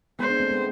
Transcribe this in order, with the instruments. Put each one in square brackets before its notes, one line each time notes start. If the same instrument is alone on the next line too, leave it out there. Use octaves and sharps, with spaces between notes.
[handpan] G#3 B3 [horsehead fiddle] C5
[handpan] B3 D4
A3 C4
G#3 B3